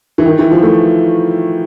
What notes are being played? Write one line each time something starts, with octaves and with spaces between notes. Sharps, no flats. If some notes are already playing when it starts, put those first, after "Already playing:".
E3
D#3
E3
F3
A3